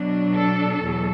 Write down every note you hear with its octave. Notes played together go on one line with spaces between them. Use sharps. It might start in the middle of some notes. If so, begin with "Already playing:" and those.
Already playing: B2 F#3 D4
A4
E2 B2 F#3